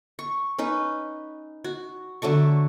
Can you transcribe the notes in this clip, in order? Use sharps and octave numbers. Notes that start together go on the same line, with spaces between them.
C#6
C#4 D#4 B4
F#4
D3 F#3 A3 C#6